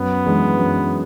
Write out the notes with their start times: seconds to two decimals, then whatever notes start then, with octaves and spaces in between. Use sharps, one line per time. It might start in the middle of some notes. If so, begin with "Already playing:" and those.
Already playing: F#2 B3
0.26 E3 G#3 D4
0.59 F#2